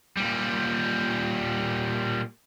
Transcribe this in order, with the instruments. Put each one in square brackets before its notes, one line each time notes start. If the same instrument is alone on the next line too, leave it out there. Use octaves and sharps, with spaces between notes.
[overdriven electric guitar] A#2 G3